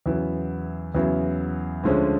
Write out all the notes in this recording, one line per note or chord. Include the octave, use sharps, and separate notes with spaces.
E2 C#3 F#3 B3 E4
E2 C#3 F#3 B3 E4
D2 D3 F3 G#3 C#4